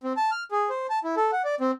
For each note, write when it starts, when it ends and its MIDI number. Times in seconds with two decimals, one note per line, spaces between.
0.04 0.13 60
0.17 0.30 81
0.31 0.44 89
0.51 0.69 68
0.70 0.87 72
0.90 0.99 81
1.04 1.15 64
1.17 1.31 69
1.32 1.42 78
1.45 1.55 74
1.60 1.71 60